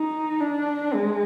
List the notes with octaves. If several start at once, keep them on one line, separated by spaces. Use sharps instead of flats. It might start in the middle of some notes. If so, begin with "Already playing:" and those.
Already playing: D#4
D4
G#3